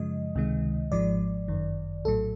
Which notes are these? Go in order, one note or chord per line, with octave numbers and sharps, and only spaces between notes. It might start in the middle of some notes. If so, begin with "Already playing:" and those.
Already playing: F#2 C#3 F3 G#3 D#5
C#2 C3 D#3 G#3
G#1 G#2 F3 G#3 D5
G1 F#2 D#3
A#1 A2 F#3 A4